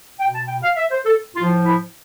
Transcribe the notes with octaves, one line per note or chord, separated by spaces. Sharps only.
B2 G5
A5
G5
F5
E5
C5
A4
A2 F3 F4
E4